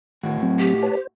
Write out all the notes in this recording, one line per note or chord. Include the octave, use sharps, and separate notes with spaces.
A2 D#3 F#4
F#3 C4
G4
B4 C#5 A5
C5